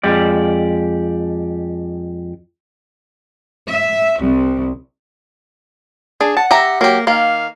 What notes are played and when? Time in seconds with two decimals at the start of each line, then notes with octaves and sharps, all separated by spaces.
0.03 F2 G#3 G4 D5
3.68 E5
4.22 C2
6.21 D4 G#4
6.37 F#5 A5
6.51 G4 E5 A#5
6.81 F#3 A#3 G4
7.07 D#3 A#3 F5